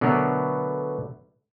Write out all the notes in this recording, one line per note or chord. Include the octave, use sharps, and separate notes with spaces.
B2 D3 F#3 A3 B3 A#4